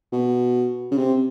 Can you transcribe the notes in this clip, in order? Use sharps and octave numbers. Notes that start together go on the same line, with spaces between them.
B2
C#3
C3